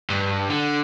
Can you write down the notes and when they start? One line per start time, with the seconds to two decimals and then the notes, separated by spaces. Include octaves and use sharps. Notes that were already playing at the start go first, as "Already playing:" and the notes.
0.10 G2
0.50 D3